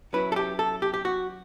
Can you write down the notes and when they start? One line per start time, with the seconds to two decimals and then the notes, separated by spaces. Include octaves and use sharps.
0.13 F#3 C#4 E4 B4
0.32 A4
0.36 G4
0.59 A4
0.82 G4
0.94 G4
1.05 F#4